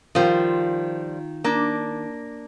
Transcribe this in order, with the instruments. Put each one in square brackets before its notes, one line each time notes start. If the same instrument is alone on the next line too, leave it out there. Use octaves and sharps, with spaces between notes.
[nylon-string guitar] D#3 F4 [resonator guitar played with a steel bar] F3 G3 C5
[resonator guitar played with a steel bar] A#3 D4